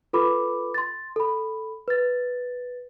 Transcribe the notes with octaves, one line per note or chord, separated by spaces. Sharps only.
F4 A4 B4 B5 D6
C6 A6
A4 B5
B4 A6